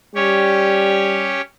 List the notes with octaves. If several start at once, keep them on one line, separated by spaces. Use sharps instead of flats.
G3 C#4 G4 C#5